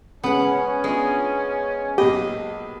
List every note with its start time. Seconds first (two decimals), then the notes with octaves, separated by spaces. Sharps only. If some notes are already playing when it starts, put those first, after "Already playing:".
0.24 C#3 G#3 B3 C#4 F#5
0.84 G#3 B3 D4 F4
1.98 B1 A#3 G4 D#5 B5